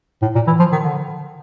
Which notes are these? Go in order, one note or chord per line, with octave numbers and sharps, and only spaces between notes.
A2
A#2
E3
F3
D#3
D3